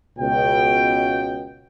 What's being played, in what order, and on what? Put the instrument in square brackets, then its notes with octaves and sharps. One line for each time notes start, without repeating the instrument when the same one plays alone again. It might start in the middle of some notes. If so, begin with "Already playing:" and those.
[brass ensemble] C#2 B2 G5